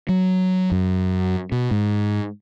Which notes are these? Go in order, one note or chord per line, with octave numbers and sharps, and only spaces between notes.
F#3
F#2
B2
G#2